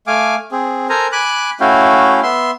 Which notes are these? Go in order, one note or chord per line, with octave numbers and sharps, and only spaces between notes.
A3 F5 G#5 D6
C4 G#4
A4 A#4 C5 G#5 A#5
G#5 B5 D6 F#6
A3 C#4 E4 F#4 F5 G5
B3 E5 C6